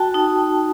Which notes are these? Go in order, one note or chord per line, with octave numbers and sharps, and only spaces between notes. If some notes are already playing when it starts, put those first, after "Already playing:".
Already playing: F#4 G5 A5
D#4